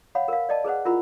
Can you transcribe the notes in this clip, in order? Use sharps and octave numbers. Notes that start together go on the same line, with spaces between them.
C#5 F5 F#5 B5
A#4 B4 F5
D5 D#5 A5
G#4 B4 C5 F#5
E4 F4 A#4 C5 F#5 B5